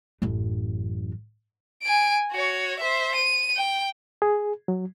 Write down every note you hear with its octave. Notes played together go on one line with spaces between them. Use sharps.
A1 F#2
G#5 D7
F#4 C#5
C5 E5
D#7
G5
G#4
F#3